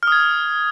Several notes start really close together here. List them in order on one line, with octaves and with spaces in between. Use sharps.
F6 D#6 G#6